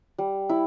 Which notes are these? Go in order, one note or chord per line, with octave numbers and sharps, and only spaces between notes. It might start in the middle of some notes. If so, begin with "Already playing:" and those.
G3
E4